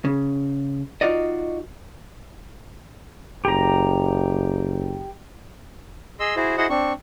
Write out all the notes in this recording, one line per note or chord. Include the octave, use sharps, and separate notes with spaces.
C#3
D#4 F4 F#4 D5 D#5
F#1 G4 A#5
G#4 D#5 C6 E6
E4 F#4 G#4 C5
E4 F#4 G#4 C5 D#5 F#5
C4 D4 C#6